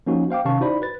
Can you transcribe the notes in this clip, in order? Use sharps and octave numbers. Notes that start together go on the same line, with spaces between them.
F3 A#3 C#4 D#4 F#4
C5 F5 G5 D6
C3 D#3 C#4 F5 A5 C#6
D#4 E4 F#4 C5 D5 B5
B4 A6